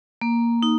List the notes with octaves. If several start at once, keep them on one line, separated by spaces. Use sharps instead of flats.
A#3
D#4